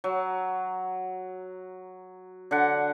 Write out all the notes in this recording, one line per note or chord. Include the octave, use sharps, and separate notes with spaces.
F#3
D3 F#5